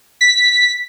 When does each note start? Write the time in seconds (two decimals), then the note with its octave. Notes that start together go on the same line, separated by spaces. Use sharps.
0.21 B6